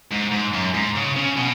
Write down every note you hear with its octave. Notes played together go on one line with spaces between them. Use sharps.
G#2
G#2
F#2
G#2
C#3
C#3
B2